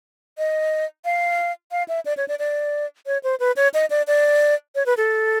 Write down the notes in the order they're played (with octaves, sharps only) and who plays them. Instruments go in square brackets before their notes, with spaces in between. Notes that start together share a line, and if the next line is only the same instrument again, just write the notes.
[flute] D#5
F5
F5
E5
D5
C#5
D5
D5
C#5
C5
B4
C#5
D#5
D5
D5
C#5
B4
A4